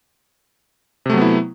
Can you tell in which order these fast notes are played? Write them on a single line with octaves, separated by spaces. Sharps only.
C3 A3 F#3 B3 E4